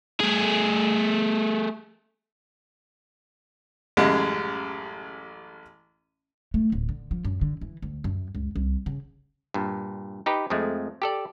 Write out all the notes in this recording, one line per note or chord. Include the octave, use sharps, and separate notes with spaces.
A3 G#4
A1 F#2 G3 G#3
A3
D1
D3
F3
F#2
D3
E3
D2
F#2
C#2
C2
C#3
G2 A#2
D#4 G4 B4
F2 F3 G#3 A3
G4 A4 D5